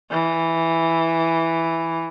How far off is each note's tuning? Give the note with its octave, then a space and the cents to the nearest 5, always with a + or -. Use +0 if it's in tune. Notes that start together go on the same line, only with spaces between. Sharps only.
E3 +0